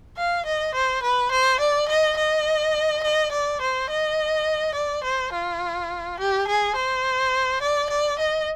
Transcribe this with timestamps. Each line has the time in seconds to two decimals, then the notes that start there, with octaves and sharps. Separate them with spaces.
0.17 F5
0.45 D#5
0.74 C5
1.03 B4
1.31 C5
1.60 D5
1.88 D#5
2.17 D#5
3.03 D#5
3.32 D5
3.61 C5
3.90 D#5
4.75 D5
5.04 C5
5.32 F4
6.19 G4
6.48 G#4
6.76 C5
7.62 D5
7.90 D5
8.19 D#5